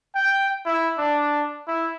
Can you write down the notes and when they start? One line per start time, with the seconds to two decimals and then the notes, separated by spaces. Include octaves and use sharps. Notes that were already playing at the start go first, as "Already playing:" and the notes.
0.15 G5
0.66 E4
0.98 D4
1.68 E4